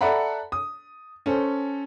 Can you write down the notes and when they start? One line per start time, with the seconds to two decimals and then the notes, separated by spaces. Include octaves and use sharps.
0.01 A4 D5 E5 F#5 A#5 B5
0.52 D#6
1.26 C#4 A4 C5